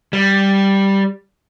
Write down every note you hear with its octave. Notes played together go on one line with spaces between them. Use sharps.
G3